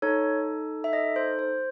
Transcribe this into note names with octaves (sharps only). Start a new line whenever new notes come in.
D#4 A4 C#5
E5
D#5
C5
C5